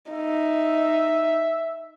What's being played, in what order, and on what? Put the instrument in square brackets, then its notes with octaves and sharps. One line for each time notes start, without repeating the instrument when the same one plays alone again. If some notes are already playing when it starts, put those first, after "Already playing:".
[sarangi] D#4 [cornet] E5